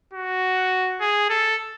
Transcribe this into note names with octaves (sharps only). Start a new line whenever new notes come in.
F#4
G#4
A4